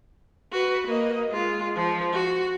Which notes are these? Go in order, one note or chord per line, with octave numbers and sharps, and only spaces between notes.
F#4 B4
A#3 D#5
G#3 F4
F3
F#4